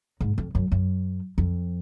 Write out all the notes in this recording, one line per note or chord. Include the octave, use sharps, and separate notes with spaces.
G#2
F2
F#2
F#2
F2